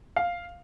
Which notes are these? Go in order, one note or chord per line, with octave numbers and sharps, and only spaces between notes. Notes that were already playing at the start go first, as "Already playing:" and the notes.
F5